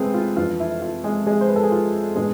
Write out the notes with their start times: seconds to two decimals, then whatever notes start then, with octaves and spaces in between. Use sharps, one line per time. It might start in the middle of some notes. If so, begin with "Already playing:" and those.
Already playing: C3 E3 G#3 A3 C4 G#4 A4 B4
0.14 F4
0.37 F2 E3 A3 D4 F4
0.60 E4
0.82 F4
1.04 G#3 G#4
1.27 G#3 G#4
1.41 C5
1.49 B4
1.56 A4
1.63 G#4
1.72 F4
2.16 A2 E3 G#3 B3 D4 G#4